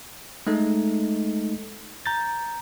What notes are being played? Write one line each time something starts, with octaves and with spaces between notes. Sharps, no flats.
G#3 A3 D#4 A4
A#5 G6 A6